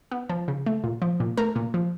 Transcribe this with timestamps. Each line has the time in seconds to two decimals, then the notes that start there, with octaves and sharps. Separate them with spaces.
0.12 B3
0.29 F3
0.48 C#3
0.66 A3
0.84 A#2
1.02 F3
1.20 A#2
1.38 A3 A#4
1.56 A#2
1.74 F3